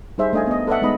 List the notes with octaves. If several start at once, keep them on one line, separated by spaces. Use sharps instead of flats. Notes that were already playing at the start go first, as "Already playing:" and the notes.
G3 D#4 G#4 C5 E5
A3 D4 D#5 F5 G#5
B3 D#5
A4 B4 D5 E5 F#5
G#3 A3 B3 D#4 D#5 B5